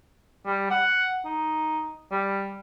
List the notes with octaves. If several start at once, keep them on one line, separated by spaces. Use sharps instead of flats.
G3
F#5
D#4
G3